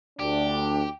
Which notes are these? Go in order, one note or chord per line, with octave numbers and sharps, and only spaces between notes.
D2 D4 G4